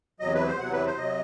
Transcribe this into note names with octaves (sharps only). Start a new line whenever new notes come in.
E2 C3 F#3 D#5
B4
C5
E2 C3 F#3 F#5
B4
C5
C3 F#3 D#5